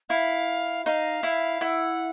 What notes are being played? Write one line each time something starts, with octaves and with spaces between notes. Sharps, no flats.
E4 F5
D#4 F5
E4
E4 F#5